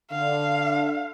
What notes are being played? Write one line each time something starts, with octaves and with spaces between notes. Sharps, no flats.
D3 F5